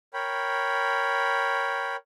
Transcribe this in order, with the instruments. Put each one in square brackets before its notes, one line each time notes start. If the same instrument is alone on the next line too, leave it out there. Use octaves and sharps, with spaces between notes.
[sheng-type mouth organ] A#4 C#5 G5 B5